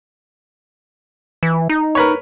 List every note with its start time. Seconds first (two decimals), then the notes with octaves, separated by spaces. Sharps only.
1.43 E3
1.69 D#4
1.95 A#4 B4 C#5